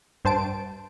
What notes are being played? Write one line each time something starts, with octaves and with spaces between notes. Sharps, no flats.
G2 C5 A5 D7